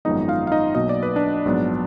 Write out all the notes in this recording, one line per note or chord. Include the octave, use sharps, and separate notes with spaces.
G#1 F#2 F3 G#3 B3 D#4 D#5
F4 F5
F5
D#4 D#5
B1 B2 F#3 A#3 D#5
D5
B4
D4 D5
A#1 G#2 F#3 B3